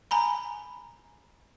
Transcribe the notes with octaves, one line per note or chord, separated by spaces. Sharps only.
G#5 A#5 B5